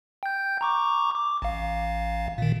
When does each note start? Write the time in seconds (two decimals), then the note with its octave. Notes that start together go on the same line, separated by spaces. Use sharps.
0.23 G5 G6
0.61 A#5 C#6 D6
1.14 D6
1.42 A1 F5
2.38 A#2 D#3